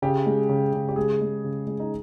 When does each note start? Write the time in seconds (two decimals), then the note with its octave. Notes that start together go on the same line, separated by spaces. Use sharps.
0.02 C#3 G4
0.26 G#3
0.49 C#3
0.74 C#3
0.89 G4
0.96 G#3 G#4
1.21 G#3
1.44 C#3
1.67 G#3
1.80 D#4